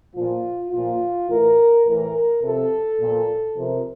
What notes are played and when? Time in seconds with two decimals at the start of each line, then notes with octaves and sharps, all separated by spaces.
0.14 A#2 F3 F4
0.71 A#2 F3 F4
1.27 A2 E3 A#4
1.84 A2 E3 A#4
2.41 C3 F3 A4
2.99 A#2 F3
3.56 C3 F3 A#4